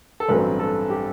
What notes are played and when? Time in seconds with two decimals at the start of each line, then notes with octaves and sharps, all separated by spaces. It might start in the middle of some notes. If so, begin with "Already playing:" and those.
0.20 A4
0.28 A1 G2 F#3 C4 B4
0.59 A4
0.90 G4